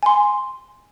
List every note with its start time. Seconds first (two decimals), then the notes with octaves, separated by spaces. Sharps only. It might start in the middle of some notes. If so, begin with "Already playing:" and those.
0.03 G#5 C6